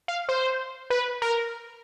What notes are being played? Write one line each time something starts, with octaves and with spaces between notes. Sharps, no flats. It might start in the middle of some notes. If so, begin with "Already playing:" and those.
F5
C5
B4
A#4